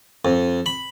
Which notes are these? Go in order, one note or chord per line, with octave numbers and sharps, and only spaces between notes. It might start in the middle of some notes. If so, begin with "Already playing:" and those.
F2
B5